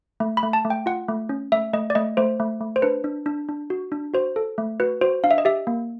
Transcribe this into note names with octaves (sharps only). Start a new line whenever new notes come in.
A3
B5
A3
A5
A3
G5
F4 F#5
A3
C#4
A3 E5
A3 D#5
D5
A3 D#5
A3 C5
A3
A3
C5
D4 B4
D4
D4
D4
F#4
D4
F#4 C5
A4
A3
F#4 B4
F#4 C5
D4 F5
E5
D#5
G4 E5
A#3